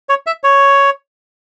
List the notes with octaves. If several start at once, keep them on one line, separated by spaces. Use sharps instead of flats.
C#5
E5
C#5